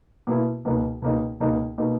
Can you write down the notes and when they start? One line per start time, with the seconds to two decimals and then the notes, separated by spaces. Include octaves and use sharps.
0.27 B2 A#3 E4
0.65 C#2 B2 A#3 D#4
1.02 C#2 B2 A#3 D#4
1.40 C#2 B2 A#3 D#4
1.78 B2 A#3 D#4